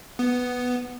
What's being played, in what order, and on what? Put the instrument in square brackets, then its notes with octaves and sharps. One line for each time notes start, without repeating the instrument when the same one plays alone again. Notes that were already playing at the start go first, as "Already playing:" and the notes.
[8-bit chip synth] B3